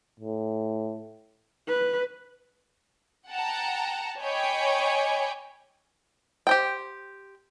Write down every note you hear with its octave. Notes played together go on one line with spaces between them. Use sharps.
A2
B4
F#5 G5 A5 A#5
C#5 D#5 G5 G#5 B5 D6
G4 C5 G5